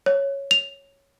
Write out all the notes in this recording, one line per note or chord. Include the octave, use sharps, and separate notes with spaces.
C#5
F7